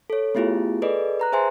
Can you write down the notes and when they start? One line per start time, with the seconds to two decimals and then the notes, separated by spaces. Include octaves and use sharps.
0.10 A4 C#5
0.35 A3 B3 E4 F4 G4 G#4
0.82 G#4 A4 B4 D5 D#5
1.20 B4 A#5 F#6
1.32 G#4 C5 E5 G#5 A5 C6